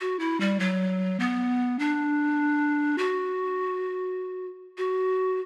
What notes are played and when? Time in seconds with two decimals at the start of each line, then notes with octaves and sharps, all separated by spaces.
0.01 F#4
0.19 E4
0.40 G3
0.60 F#3
1.20 B3
1.79 D4
2.98 F#4
4.78 F#4